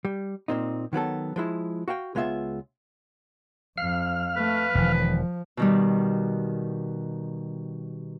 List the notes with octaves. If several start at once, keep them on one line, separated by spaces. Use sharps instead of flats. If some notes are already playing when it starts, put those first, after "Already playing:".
G3
A#2 C4 D#4
D#3 F#3 B3 A4
F3 G#3 E4
F#4 F5 G5
C#2 G#3 B3 F4 E5
F2 F5 F6
A3 B4
E1 D#3 F3
B2 D#3 G3